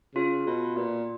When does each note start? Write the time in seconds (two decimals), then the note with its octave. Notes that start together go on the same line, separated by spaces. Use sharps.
0.15 C#3 F4
0.46 B2
0.76 A#2